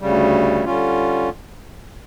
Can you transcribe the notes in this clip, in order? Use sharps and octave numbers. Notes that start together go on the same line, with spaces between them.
D2 C#3 G3
D3 G3 C#4 F4